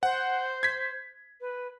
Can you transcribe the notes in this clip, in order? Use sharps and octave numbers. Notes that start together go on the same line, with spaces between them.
C5 F#5
G#6 B6
B4